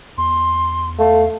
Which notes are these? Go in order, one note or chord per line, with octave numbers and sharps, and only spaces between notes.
E2 C6
A3 F5